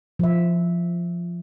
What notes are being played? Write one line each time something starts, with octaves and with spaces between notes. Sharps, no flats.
F3 E5